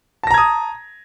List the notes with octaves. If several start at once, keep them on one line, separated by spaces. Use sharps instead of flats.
A5 A#5 D#6 G#6 A#6